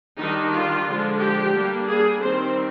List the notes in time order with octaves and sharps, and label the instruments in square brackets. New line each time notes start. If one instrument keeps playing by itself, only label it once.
[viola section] D#3 G3 D4 D#4
F4
D3 F3 G#3 D4
G4
G3 A#3 D4
G#4
D#3 G3 C4 C5